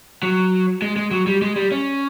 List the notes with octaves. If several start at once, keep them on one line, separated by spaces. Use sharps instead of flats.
F#3
G#3
G#3
F#3
G3
G#3
G3
C#4